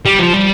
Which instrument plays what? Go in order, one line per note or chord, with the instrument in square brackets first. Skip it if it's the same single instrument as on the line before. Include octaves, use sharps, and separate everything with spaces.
[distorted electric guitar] G3
F3
G3